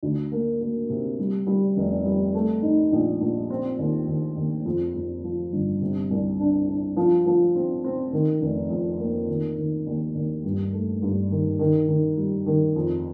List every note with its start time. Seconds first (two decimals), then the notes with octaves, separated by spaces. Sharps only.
0.03 D2
0.32 A#3
0.61 A#3
0.90 C3
1.19 G3
1.47 G3
1.77 F1
2.05 G3
2.34 A3
2.62 D#4
2.92 A#1
3.21 A#1
3.50 C4
3.79 D#2
4.08 D#2
4.37 D#2
4.65 F2
4.94 F2
5.24 F3
5.52 G1
5.81 C3
6.10 C2
6.40 D4
6.68 D4
6.96 F3
7.26 F3
7.55 C4
7.84 C4
8.13 D#3
8.41 F1
8.70 F2
8.99 A#3
9.28 D#3
9.57 D#3
9.86 D#2
10.15 D#2
10.44 G2
10.73 A3
11.02 G2
11.31 D#3
11.59 D#3
11.88 D#3
12.18 G3
12.46 D#3
12.76 F2